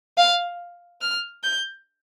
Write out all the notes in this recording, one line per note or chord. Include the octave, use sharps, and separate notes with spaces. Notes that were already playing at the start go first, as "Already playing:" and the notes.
F5
F6
G6